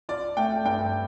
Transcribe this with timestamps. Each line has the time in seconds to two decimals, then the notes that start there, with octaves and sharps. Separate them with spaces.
0.09 F4 D5
0.37 A3 G5
0.65 G2 G5